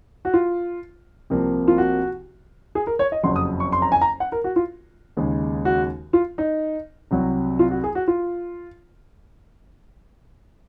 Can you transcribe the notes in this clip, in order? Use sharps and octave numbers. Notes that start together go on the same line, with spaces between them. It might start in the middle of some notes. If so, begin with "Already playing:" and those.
F#4
F4
C2 C3 F3 A#3
F4
F#4
G#4
A#4
C#5
D#5
F#1 F2 C#3 F#3 C6
D#6
C#6
C6
A#5
G#5
A#5
F#5
A#4
F#4
F4
D#2 C#3 G#3
F#4
F4
D#4
C2 C3 F#3
F4
F#4
G#4
F#4
F4